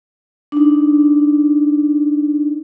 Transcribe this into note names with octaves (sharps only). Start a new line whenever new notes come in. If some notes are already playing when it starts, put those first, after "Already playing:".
D4 D#4